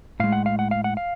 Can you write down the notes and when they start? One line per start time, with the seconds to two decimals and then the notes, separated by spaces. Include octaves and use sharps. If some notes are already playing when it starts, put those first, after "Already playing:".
0.20 A2 G#3 F5
0.32 F#5
0.46 F5
0.59 F#5
0.71 F5
0.84 F#5
0.97 F5